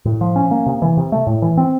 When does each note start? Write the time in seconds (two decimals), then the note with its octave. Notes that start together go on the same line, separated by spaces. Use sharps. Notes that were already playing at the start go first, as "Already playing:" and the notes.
0.05 A2
0.21 F3
0.36 C#4
0.51 A#3
0.66 C3
0.82 E3
0.97 C3
1.12 A3
1.27 A2
1.42 E3
1.57 C4